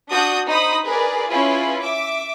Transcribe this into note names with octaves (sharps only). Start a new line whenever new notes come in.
D4 F#4 D#6 G6
D#4 C5 B5 D#6
G#4 A#4 B4 D5
C#4 E4 F4 G#4 B4
E5 D6